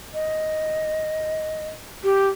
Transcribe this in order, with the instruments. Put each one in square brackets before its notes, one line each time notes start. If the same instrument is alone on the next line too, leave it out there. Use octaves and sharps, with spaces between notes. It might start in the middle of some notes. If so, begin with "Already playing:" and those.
[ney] D#5
G4